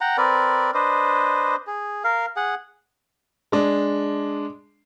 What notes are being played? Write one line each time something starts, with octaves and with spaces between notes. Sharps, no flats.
F#5 G5 A#5
C4 A#4 B4 D5
D4 B4 C5 D#5
G#4
A#4 F5
G#4 F#5
G#3 D4